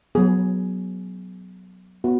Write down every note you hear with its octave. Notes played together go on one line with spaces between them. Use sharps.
F#3 B3 G#4
B3 F#4